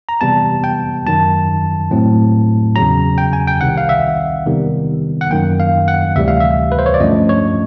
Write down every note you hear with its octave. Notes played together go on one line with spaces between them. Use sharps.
A#5
C3 E3 G3 B3 A5
G5
F#2 D#3 F#3 A5
A2 F#3 A3 C4
E2 C#3 F#3 A#5
G5
G#5
G5
C2 C3 D#3 F#5
F5
E5
C3 D#3 G3 B3
F#5
F#2 D#3 F#3 A#3 G5
F5
F#5
D2 C3 E3 G3 E5
F5
E5
B4
C5
C#5
D5
G2 D3 F3 A3 C#4 D#5
C#5